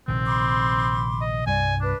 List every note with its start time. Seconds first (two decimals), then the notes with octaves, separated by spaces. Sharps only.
0.08 A#1 C3 D#3 C4
0.25 B5 C6 D6
1.21 D#5
1.46 C2 G2 G3 D5 G#5
1.81 D4 B4